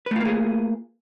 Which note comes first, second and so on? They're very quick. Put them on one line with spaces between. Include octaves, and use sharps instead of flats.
B4 A3 F4 A#3 G#4